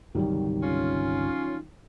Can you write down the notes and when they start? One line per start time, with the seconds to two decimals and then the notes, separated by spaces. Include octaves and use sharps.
0.15 G1 C2 D#3 F#3 G3
0.62 C#4 F4